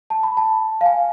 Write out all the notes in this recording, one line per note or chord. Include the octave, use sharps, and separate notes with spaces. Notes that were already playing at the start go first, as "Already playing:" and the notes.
A5
B5
A5
F5
G#5